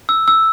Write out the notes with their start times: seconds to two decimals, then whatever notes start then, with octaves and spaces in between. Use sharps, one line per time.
0.09 E6
0.28 E6